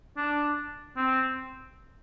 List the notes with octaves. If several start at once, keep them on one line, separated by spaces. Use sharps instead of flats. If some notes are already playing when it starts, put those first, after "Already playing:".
D4
C4